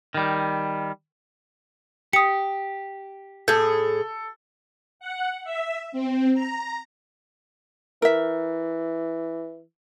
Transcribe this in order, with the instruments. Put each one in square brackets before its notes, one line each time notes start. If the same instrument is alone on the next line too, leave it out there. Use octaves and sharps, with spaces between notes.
[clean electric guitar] D#3 G3
[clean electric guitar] G4 [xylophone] D#6 C#7
[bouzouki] A2 G#4 [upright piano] A4 [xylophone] G6 G#6
[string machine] F#5
E5
C4
A#5
[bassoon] E3 [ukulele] A#4 E5